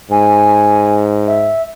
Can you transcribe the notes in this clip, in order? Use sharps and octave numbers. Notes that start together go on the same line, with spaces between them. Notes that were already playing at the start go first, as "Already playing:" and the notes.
G#2 G#5
E5